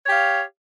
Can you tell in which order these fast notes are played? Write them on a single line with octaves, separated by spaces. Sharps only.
C#5 G4 F5